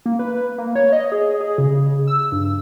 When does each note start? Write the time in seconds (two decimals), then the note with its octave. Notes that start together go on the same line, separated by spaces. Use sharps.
0.06 A#3
0.19 B4
0.58 A#3
0.75 C#5
0.92 D#5
1.12 G#4
1.41 G#4
1.58 C#3
2.07 E6
2.32 G2